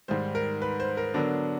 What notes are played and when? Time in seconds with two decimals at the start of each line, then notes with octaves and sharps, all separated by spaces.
0.08 G#2 D#3 G3 C5
0.35 A#4
0.62 B4
0.80 C5
0.97 A#4
1.14 D3 F#3 B3 D4 A#4